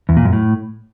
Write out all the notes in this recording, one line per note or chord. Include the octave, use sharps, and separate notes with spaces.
E2
A#2
F#2
A2